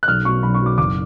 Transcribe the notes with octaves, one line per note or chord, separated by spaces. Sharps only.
F#6
B1 F6
B2 F#3 C#6
B1 B5
C#6
B2 F#3
D6
F#1 D6